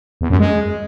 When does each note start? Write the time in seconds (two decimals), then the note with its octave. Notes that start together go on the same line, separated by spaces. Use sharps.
0.21 E2
0.30 F#2
0.40 G#3